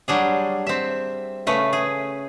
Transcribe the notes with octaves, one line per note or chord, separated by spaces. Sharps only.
F#3 G3 D4 G#4
C4 E5
C#3 A3 B4
G#4